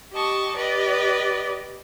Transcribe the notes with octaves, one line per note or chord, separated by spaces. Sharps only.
G4 D#5 A5 C#6
G4 B4 D5 D#5